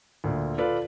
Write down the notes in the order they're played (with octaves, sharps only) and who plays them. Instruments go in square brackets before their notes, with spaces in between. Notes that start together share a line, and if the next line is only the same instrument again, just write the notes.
[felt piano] D2 A#2
F4 A4 B4 D5 F5